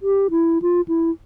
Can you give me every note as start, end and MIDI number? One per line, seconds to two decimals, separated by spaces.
0.01 0.28 67
0.30 0.58 64
0.62 0.81 65
0.88 1.10 64